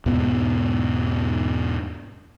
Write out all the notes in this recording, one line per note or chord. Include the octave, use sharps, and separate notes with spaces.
E2 G#2 B2 B3